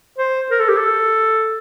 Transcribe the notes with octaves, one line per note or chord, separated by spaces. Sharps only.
C5
A#4
A4
G4
A4